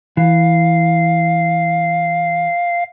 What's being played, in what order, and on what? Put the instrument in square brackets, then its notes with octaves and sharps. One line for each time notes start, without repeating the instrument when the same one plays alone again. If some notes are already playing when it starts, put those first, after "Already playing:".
[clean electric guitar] E3 [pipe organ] F5